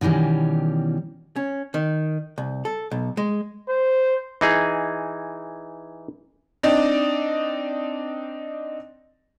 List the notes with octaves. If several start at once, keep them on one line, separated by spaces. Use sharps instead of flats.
B2 D#3 E3 G3 C#4
C#4
D#3
C2
A4
B1
G#3
C5
E3 D#4 G#4
C4 D4 D#4 D5 D#5